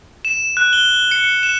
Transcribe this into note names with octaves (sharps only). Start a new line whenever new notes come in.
E7
F#6
G7
C#7
E7